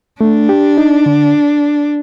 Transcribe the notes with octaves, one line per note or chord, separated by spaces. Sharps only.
A3 D4
G4
D#4
D3